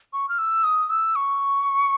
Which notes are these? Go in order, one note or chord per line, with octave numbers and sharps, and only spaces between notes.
C#6
F6
E6
D#6
E6
C#6